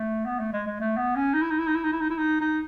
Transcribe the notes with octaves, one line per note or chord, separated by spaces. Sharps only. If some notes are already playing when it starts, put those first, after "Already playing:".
Already playing: A3
B3
A3
G#3
G#3
A3
B3
C#4
D#4
E4
D#4
E4
D#4
E4
D#4
E4
D#4
E4
D#4
D#4